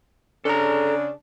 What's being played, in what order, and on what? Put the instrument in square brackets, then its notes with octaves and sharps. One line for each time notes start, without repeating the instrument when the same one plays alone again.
[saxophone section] C#3 D4 [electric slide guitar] A4 A#5